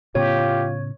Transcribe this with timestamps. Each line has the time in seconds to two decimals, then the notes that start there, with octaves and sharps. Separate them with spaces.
0.15 A2 C#3 B3 F4 G4 C#5